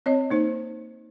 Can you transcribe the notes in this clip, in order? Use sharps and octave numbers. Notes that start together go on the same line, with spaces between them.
C4 C#5 D#5
A#3 D#4 C5